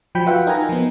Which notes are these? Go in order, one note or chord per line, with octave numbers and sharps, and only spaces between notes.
F3 F#3 G5 B5 G6
F4 F#4 B4 E5 F#5 G5
D#4 A#4 G#5 A#5
F3 B3